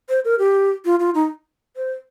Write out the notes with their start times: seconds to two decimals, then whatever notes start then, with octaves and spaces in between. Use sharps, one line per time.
0.09 C5
0.25 A#4
0.39 G4
0.85 F4
1.00 F4
1.15 D#4
1.77 C5